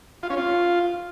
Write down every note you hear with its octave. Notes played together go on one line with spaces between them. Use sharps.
F4
C#4
F4